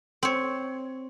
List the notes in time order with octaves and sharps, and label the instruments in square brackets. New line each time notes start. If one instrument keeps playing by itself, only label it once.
[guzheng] C4 C#5